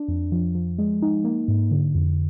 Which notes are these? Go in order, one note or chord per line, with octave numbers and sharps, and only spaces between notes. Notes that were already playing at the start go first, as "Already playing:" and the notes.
Already playing: D4
F2
F3
F3
G#3
D#4
A#3
G#2
D3
F2